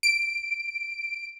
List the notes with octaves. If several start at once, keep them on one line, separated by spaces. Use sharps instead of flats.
D7